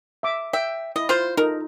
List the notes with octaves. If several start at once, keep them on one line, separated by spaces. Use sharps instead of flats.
E5 D6
E5 G5
E4 D#5
F4 C5
D#4 F4 A4 A#4